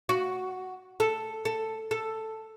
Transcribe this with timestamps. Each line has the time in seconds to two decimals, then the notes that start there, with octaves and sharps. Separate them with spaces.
0.09 F#4
1.00 A4
1.45 A4
1.91 A4